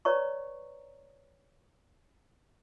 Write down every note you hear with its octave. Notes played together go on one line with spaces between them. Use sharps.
B4 C#5 D5 A#5 C#6